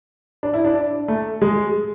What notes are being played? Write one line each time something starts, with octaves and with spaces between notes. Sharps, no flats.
D4
E4
D4
A3
G#3